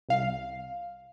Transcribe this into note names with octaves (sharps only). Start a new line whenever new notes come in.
C2 F5